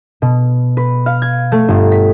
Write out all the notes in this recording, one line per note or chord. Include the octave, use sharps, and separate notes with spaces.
B2
B4
F5
G#6
A3
G1
B6